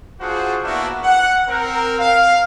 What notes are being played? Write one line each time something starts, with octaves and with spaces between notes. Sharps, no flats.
D4 F4 F#4 G#4 C5 F#5
A#3 B3 D4 E4 F#4
F#5
C4 A#4
F5